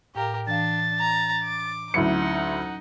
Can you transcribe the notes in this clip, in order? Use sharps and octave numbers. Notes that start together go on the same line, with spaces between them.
A2 G4 A#4 F5
E3 D4 F5 A6
A#5
D6
D2 F#3 C#4 D#4 E4 F#5 C#7